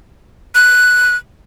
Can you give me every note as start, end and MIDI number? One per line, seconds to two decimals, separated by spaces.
0.55 1.16 90